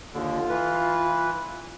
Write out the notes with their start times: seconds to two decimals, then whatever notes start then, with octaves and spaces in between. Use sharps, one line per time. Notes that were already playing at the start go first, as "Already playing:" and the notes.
0.14 D#2 D3 F4
0.49 E3 B4